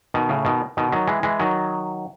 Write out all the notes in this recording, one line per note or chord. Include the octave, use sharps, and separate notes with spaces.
B2 D#3
A2 C#3
B2 D#3
B2 D#3
D#3 F#3
E3 G#3
E3 G#3
D#3 F#3